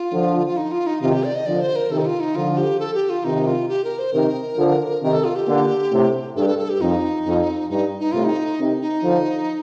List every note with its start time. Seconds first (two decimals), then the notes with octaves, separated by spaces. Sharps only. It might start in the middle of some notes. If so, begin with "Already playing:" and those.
Already playing: F4
0.12 D3 F3
0.47 F4
0.57 D#4
0.72 F4
0.87 D#4
1.02 C3 D#3 F4
1.13 G4
1.24 D5
1.35 D#5
1.46 D3 F3 D5
1.61 C5
1.76 A#4
1.91 C3 D#3 A4
1.99 D#4
2.06 F4
2.20 D#4
2.35 D3 F3 F4
2.58 G4
2.80 A4
2.94 G4
3.10 F4
3.24 C3 D#3 D#4
3.47 F4
3.69 G4
3.84 A#4
3.99 C5
4.13 C3 D#3 A#4
4.58 D3 F3
5.02 C3 D#3 A#4
5.13 A4
5.24 F4
5.36 G4
5.47 A#2 D3
5.91 A2 C3
6.36 G2 A4
6.43 G4
6.48 A4
6.59 A4
6.69 G4
6.81 F2 D#4
7.26 F2
7.70 G2 D#4
8.00 D#4
8.12 A2 C3 F4
8.24 D#4
8.59 C3 D#3
8.81 D#4
9.03 D3 F3